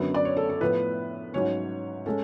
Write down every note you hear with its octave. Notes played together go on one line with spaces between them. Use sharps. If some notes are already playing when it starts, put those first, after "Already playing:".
Already playing: F#2 D3 F#3 B3
D5
C#5
A4
A4
A2 F3 B3 B4
G#2 F#3 C#4 C#5
G#3 C#4 A4